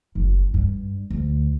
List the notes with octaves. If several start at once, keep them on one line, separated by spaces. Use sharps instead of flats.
F#1
G2
D2